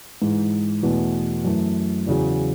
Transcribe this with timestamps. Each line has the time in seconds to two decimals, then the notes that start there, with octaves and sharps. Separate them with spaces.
0.22 G#2 E3 G#3
0.83 E2 B2 A3
1.44 F#2 E3 A3
2.07 E2 C#3 F#3